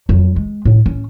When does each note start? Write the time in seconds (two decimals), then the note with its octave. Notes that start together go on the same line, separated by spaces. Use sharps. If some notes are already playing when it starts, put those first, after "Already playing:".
0.09 F2 F#3
0.36 G#3
0.65 A2
0.86 C#4